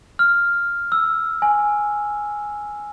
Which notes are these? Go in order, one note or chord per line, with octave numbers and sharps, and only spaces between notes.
F6
E6
G#5